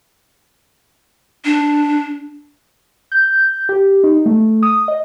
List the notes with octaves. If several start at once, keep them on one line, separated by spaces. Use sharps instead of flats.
D4
G6
G4
D#4
A3
D#6
D#5